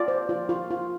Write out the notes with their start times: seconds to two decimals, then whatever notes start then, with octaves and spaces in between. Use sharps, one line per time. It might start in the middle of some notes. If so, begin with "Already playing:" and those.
Already playing: F4 D5
0.08 C5
0.29 F4
0.49 F4
0.70 F4